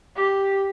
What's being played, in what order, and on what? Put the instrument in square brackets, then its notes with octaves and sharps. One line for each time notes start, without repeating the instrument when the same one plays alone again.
[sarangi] G4